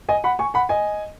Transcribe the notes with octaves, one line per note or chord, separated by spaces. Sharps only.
D#5 G#5
F#5 B5
G#5 C#6
F#5 B5
D#5 G#5